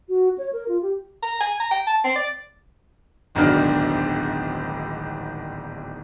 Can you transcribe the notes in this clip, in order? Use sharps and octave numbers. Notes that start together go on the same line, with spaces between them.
F#4
C#5
A#4
F4
G4
A#5
G#5
A#5
G5
A5
C4
D5
D1 G#1 B2 D#3 D4 F6